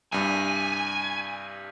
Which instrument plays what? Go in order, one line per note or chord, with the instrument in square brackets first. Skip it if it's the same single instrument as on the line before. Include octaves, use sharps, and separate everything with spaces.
[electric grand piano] C2 G2 [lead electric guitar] G#5